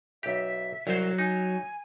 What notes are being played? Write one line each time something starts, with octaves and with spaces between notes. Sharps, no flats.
B1 G4 E5
C2 F#3 C5
D#4 G#5